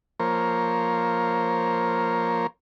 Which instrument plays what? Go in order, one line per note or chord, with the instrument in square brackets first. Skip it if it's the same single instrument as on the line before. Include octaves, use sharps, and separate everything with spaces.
[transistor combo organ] F3 A#3 A#4 C5 C#5